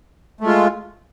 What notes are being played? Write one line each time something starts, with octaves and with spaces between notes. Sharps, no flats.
G#3 A3 F4